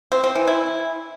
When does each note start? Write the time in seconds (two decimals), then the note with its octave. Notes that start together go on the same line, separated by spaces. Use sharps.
0.12 C4
0.24 C4
0.35 E3
0.47 E4